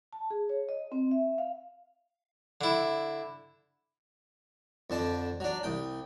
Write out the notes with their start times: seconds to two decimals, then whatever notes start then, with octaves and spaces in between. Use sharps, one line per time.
0.13 A5
0.31 G#4
0.49 C#5
0.69 D#5
0.92 C4
1.11 E5
1.38 F5
2.61 D3 E4
4.90 F2 D3 A5
5.40 F#3 D4
5.63 C2 G5